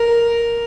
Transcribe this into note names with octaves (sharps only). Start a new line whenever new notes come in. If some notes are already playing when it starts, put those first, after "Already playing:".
Already playing: A#4